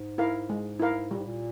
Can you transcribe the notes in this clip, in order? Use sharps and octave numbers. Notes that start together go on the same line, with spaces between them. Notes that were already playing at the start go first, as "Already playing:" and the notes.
Already playing: G#2
E4 A#4 F5
G#3
E4 A#4 F5
A#2 G3
G#2
A#2